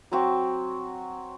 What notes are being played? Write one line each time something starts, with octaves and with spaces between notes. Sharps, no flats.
F#3 C4 F#4